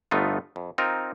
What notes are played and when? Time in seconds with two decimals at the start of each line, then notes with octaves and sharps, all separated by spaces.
0.11 G1 A3 B3 D#4 F4
0.56 F2
0.78 C4 D#4 F4 A#4